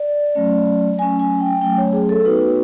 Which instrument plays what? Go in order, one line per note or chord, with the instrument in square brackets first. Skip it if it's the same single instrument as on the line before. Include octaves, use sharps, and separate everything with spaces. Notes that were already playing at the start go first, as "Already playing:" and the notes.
Already playing: [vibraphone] D5
F#3 A3 C#4
F#3 A3 C#4 G#5
G#5
G5
F#3 A3 C#4 G5
C#5
G#4
A4
B3 D#4 F#4 B4
B4